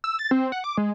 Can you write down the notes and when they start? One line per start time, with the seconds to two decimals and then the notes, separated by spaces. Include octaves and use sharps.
0.04 E6
0.19 A6
0.31 C4
0.52 F#5
0.64 D6
0.78 G#3